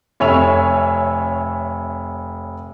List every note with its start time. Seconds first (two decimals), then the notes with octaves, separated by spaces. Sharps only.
0.20 F1 C#5 E5 G#5 E6 F7